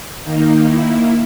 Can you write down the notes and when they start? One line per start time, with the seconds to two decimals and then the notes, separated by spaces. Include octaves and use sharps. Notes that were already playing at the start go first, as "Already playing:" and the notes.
0.25 D#3 A#3 D#4
0.66 E4